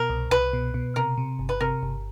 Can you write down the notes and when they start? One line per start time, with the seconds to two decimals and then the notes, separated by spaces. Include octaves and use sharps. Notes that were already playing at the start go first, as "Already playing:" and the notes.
Already playing: B2 A#4
0.10 C2
0.31 C2 B4
0.53 B2
0.74 B2
0.96 C3 A#4
1.18 C3
1.39 G1
1.49 B4
1.60 C3 A#4
1.83 G1